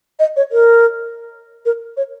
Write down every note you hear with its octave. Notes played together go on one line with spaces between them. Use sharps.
D#5
C#5
A#4
A#4
C#5